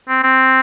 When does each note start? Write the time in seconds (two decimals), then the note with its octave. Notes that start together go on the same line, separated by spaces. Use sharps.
0.09 C4
0.23 C4